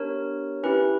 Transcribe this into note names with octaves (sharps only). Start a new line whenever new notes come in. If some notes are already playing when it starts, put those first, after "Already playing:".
Already playing: B3 D4 G4 A#4 C#5
C#4 E4 G4 B4